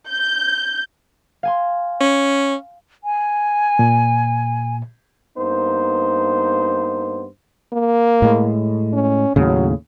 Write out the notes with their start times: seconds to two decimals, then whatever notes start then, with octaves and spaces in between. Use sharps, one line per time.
0.10 G6
1.43 F5 G#5 C6
2.01 C#4
3.04 G#5
3.79 A#2
5.38 G2 A#3 B3 D#4 C5
7.73 A#3
8.22 A2 G#3
8.93 C#4
9.36 D#2 A2 C#3 F#3